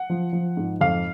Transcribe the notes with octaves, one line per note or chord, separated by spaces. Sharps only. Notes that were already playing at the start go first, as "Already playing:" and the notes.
Already playing: F#5
F3
F3
G#2
F2 F5